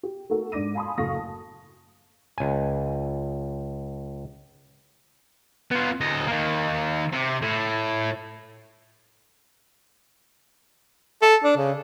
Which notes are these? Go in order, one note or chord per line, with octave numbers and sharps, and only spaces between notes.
G4
A3 D#4 F#4 A4 A#4
G#2 D4 D6 A#6 D#7
F5 G#5 A5 B5 C6 D#6
F#1 D2 A2 F5 C#6 A#6
A5
C#2 G#5
B3 F4
D2 D#5
D#3 A#3
C3
A2
A4
D4
C#3